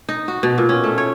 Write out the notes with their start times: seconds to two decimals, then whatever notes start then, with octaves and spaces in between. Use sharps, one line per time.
0.09 D#4
0.28 F#4
0.43 B2
0.58 A#2
0.69 C#4
0.84 A3
0.98 C#5